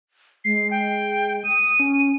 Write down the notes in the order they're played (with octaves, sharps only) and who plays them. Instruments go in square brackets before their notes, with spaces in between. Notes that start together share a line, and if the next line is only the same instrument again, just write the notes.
[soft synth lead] G#3 [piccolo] C7
[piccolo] G5
[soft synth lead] D#6 [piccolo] D#7
[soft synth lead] C#4